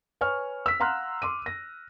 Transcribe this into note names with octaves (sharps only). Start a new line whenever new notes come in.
B4 C#5 G#5 C#6 F6
E6 B6
F5 F#5 A#5 C6 F6 F#6
C6 D6 D#7
A#6